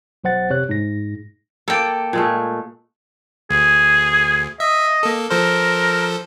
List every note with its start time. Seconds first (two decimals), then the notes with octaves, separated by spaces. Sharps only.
0.24 B1 F#3 C5 F#5 A6
0.49 G1 F2 C3 C#5 F#6
0.69 G#2 A#6
1.68 A#3 A4 D5 G5
2.13 A#2 G#3 A3
3.50 D2 G#4
4.60 D#5 E5
5.03 A#3 A4
5.30 F3 A4 A#4 C5